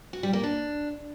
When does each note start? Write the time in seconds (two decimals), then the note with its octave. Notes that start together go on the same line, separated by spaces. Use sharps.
0.13 F#4
0.23 G3
0.33 A#3
0.43 D4